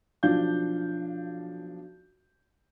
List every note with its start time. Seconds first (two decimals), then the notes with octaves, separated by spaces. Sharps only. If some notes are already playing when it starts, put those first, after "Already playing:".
0.23 B1 F3 D4 F5 G6